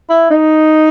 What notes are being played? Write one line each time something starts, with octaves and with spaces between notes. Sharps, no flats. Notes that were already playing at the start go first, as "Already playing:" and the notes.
E4
D#4